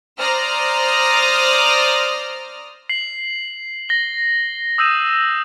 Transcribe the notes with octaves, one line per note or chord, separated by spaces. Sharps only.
C5 D5 A#5 D#6 F6
C7 F#7
A#6 G7
D#6 E6 G6 D#7 E7